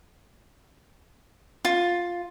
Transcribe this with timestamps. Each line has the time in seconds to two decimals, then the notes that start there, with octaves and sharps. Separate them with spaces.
1.65 F4